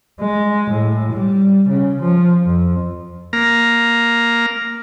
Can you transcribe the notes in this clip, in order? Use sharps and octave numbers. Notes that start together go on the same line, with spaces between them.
G#3
A2
G3
C#3
F3
F2
A#3 A#5